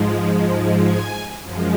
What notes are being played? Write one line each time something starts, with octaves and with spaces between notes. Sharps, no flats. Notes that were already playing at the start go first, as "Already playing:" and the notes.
Already playing: G#2 F3 G#3
G#5
F#2 F3 G#3